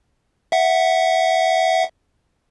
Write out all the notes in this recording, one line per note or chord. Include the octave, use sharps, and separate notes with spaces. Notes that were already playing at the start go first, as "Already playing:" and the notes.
E5 F#5